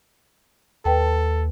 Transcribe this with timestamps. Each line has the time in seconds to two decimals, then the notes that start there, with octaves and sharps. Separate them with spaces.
0.85 D#2 A4 B4 G5 A5